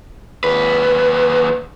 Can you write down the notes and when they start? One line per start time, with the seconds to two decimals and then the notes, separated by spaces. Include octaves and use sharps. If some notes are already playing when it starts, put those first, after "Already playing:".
0.44 D#2 B4